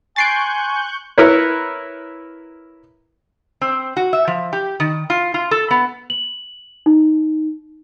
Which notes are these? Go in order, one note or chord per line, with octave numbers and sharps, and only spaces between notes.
G#5 C6 C#6 F#6 G6 A6 C7 D7
E4 A#4 B4 C#5
C4
F#4
E5
F3
G4
D#3
F4
F4
A4
B3
F#7
D#4